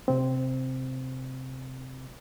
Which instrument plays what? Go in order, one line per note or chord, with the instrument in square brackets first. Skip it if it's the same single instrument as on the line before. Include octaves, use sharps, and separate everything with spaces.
[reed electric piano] C3 C4